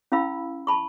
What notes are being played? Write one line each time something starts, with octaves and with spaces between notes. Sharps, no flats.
C#4 E4 F5 B5 E6
A5 B5 C#6